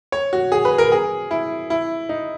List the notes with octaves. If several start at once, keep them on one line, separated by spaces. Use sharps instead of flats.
C#5
F#4
G#4
B4
A#4
G#4
E4
E4
D#4